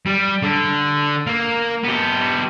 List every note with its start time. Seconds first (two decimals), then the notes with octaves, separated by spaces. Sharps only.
0.06 G3
0.43 D3
1.27 A#3
1.84 B3 G4